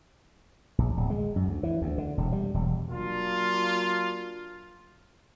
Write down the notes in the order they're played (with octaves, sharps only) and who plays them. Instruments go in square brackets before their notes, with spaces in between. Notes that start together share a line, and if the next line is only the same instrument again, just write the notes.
[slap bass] A#1
D1
G#3
F#2
D2
E3
D2
D3
E1
G3
E1
[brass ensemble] F#3 A#3 D4 F4